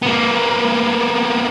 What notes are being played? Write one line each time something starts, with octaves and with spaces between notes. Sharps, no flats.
A#3 B3